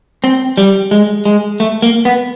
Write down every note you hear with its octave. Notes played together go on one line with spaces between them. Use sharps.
C4
G3
G#3
G#3
A3
A#3
B3